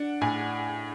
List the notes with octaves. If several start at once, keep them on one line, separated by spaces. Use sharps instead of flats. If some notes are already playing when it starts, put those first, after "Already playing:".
Already playing: D4 F#5
A2 G#5